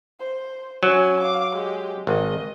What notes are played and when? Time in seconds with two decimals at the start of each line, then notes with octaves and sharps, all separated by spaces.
0.20 C5
0.83 F#3 C#4 G#5
1.20 F5 D6
1.55 G#3 G4
2.07 G#1 D#5